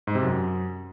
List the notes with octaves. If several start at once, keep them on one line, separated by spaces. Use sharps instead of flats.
G#2
C3
F#2